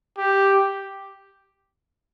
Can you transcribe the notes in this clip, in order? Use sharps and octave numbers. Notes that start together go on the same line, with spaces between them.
G4